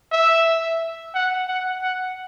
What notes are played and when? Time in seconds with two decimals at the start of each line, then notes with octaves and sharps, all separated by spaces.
0.12 E5
1.15 F#5
1.48 F#5
1.83 F#5